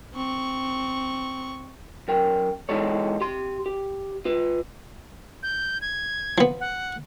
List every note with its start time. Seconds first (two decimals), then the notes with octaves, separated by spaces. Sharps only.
0.14 C4 C#6
2.08 F#2 A#4 G5
2.69 E3 G#3 D#4 A4 C#5
3.21 G4 C6
3.66 G4
4.25 F4 B4
5.43 G6
5.81 G#6
6.38 F3 B3
6.60 F#5